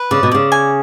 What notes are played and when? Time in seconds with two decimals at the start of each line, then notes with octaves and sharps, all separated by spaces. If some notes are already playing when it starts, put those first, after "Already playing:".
Already playing: B4
0.11 C#3 D5
0.23 B2
0.32 C#3 D5
0.52 G#5